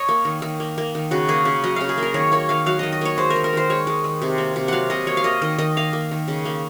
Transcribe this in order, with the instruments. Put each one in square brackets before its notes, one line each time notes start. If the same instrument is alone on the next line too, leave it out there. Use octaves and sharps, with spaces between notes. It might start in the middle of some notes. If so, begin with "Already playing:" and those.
Already playing: [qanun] C#5 D#5
A#3
D#3
D#3
A#3
A#3
D#3
C#3 F#4
A#3 G#4
C#3
F#3 D#5
C#3 F5
G#4
A#3 A#4
D#3 C#5
A#3 C#5
D#3 F5
F#3 F5
D#3 D#5
D#5
A#3 C#5
G#3 C5
A#4
D#3
A#4
D#3 C5
G#3 C#5
G#3
D#3
C3
A#3
C3
F#3 F5 F#5
C3 D#5
A#3 C#5
F5
A#3 D#5
D#3 D#5
D#3 D#5
A#3 F5
A#3
D#3
C#3
A#3